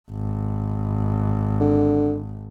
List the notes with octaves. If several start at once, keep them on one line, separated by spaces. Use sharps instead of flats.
G#1
D3